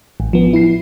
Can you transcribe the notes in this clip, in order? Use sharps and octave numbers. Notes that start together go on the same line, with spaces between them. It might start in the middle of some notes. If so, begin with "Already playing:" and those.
A1
F3 B3
E4 C7